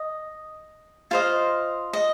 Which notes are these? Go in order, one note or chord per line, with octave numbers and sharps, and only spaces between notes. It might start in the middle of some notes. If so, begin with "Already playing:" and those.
Already playing: D#5
F4 C5 D#5 F5
D#5